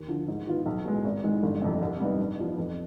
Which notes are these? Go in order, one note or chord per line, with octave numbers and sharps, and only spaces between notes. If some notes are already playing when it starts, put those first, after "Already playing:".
Already playing: D#2
D3 F3
G#2
D#3 B3 F4
B1
B2 G#3
G#1
G#2 D#3 G#3
G1
F2 C3
C2
C3 G3 B3 D#4
G2
F3 B3 D#4
F2